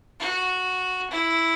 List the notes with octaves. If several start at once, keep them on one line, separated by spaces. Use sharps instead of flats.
F#4
E4